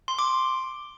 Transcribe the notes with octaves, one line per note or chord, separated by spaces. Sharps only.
C6
D6